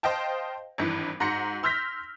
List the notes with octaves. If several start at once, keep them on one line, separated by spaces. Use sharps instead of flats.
C5 D#5 F5 G5 A5
G#1 G2 E3
G#2 F#4 A#5 C6 A#6 C#7
C6 E6 F6 G6 A#6 B6